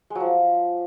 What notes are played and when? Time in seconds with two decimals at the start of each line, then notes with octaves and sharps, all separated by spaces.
0.10 G#3
0.15 F#3
0.20 F3